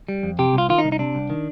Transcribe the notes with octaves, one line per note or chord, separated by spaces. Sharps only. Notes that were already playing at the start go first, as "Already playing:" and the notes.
G3
F2
C3 G4
C2 F4
D#3 F4
D#4
C2
D#4
C3 D4
C2
D#3